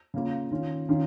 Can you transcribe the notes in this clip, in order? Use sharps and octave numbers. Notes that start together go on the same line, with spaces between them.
C#3 A#3 F4
D#3 C#4 F4
D#3 C#4 F4